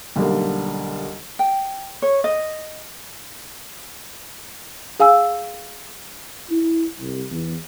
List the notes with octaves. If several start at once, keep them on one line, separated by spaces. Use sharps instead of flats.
B1 D3 G3 A#3
G5
C#5
D#5
G#4 F5 G#5 E6
E4
C2
E2